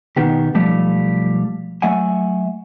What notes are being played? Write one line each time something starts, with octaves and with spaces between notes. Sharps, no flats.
B2 D#3 B3 G4
B1 F3 G3 A3
F#3 A3 E5 F#5 G#5